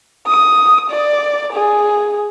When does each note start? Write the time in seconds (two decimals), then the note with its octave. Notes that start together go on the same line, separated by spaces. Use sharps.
0.28 D#6
0.91 D5
1.54 G#4